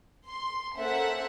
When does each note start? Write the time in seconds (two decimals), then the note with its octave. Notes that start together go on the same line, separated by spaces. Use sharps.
0.25 C6
0.75 A#3 C#4 A4 C5 E5 F#5